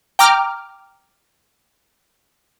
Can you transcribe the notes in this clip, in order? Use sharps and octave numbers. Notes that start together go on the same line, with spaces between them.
G5 A#5 D6 F6